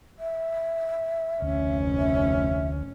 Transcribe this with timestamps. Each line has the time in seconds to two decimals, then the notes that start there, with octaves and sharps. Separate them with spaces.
0.19 E5
1.42 F1 D2 C#4
1.99 E5